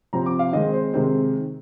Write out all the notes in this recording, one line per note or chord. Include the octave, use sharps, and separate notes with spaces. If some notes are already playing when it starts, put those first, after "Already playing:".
C3 F3 C4 A#5
D6
F5
D#3 G#3 C4 D#5
C5
C3 D#3 G#3 C4 C5